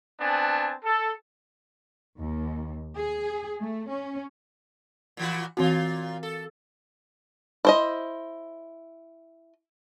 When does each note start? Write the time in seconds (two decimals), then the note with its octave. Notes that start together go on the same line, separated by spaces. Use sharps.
0.21 B3 C4 D4 G#5 A5
0.84 A4
2.19 D#2
2.97 G#4
3.59 A3
3.89 C#4
5.17 A#2 E3 F#4
5.57 A#2 E3 C4 F4 F#4
6.23 A4
7.65 E4 C5 D#5